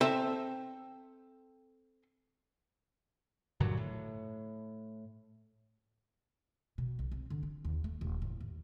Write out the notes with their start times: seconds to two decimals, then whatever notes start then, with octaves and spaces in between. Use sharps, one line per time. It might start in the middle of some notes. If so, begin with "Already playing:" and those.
0.01 C4 A4 C5 E5 A5 A#5
3.60 G2 A#2 D3 F#3
3.77 A2
6.78 B2
6.99 B1
7.12 C4
7.30 D3
7.43 C4
7.65 D#2
7.84 A3
8.01 D#1
8.22 A2
8.41 D#2